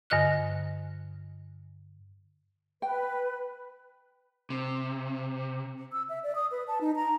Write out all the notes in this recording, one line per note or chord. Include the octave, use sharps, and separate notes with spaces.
G2 D3 D#5 F6 F#6
B4 G5
C3
E6
E5
D5
D#6
B4
A5
D#4
A#5